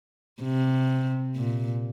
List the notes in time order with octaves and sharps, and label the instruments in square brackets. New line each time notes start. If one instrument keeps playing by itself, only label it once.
[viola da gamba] C3
A#2